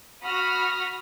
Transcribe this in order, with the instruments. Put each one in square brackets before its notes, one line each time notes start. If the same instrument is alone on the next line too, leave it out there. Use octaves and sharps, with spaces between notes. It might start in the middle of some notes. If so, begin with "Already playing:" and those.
[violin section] F#4 B5 D#6 F6 A#6